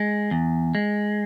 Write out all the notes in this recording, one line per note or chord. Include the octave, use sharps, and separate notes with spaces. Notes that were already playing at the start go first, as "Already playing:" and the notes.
Already playing: G#3
E2
G#3